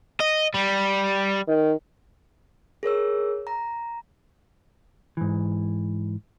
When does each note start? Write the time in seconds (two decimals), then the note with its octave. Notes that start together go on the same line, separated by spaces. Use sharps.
0.20 D#5
0.54 G3
1.48 D#3
2.83 G#4 A#4 C#5 E6
3.47 A#5
5.17 G#2 E3